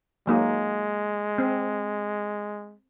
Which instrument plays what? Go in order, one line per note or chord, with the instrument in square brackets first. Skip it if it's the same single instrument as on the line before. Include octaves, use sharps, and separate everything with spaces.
[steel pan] F#3 A#3 D#4 [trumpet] G#3
[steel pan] C4